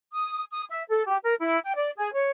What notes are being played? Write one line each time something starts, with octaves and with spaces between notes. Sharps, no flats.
D#6
D#6
E5
A4
G4
A#4
E4
G5
D5
G#4
C#5